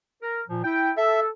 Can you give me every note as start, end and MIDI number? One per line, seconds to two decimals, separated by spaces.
0.22 0.41 70
0.48 0.61 46
0.48 0.61 53
0.63 0.90 64
0.63 0.90 79
0.97 1.28 69
0.97 1.20 76